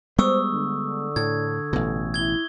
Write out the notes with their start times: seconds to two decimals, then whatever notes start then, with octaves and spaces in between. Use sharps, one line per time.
0.19 G3 G#3 B3 C5 C#6 D#6 E6
0.51 D3
1.16 A2 G#6
1.73 A1 B2
2.14 E4 G#6 G7